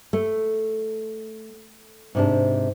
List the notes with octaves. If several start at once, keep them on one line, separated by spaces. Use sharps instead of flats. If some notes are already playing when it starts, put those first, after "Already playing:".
A3
G#2 C3 D4